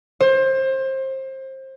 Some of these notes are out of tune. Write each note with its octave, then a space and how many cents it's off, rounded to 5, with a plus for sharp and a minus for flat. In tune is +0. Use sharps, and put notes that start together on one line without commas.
C5 +25